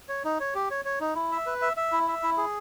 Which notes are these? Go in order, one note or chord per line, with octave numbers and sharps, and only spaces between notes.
C#5
D#4
C#5
G4
C#5
C#5
D#4
E4
E5
B4
E5
E5
E4
E5
E4
G#4